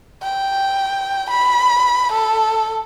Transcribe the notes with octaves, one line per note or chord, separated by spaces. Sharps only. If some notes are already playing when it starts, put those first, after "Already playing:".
G5
B5
A4